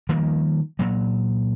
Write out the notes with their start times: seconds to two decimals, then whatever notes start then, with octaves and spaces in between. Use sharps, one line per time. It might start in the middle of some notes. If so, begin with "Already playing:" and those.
0.09 D#3 F3 G3 A#3
0.79 A#2 F#3